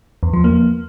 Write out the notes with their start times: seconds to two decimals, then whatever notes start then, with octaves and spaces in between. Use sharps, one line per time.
0.23 E2
0.33 F3
0.44 A#3